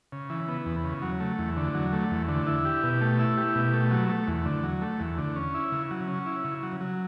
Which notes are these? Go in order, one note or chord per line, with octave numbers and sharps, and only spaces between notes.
C#3
E3
B3
E2
C#3
F#3
A3
E2
D3
F#3
A3
E2
D3
E4
G4
B2
A3
E4
G4
B2
A3
F#3
A3
E2
D3
F#3
A3
E2
D3
C#4
E4
C#3
F#3
C#4
E4
C#3
F#3
F#3